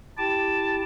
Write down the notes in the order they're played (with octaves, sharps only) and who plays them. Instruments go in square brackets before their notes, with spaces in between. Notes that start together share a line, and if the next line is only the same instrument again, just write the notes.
[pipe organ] E4 G4 G5 [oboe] A5